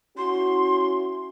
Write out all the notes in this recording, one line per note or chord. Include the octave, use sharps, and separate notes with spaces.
C#4 E4 F#4 C6